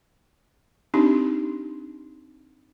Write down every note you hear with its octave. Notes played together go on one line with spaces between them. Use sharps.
C4 D4 D#4 G4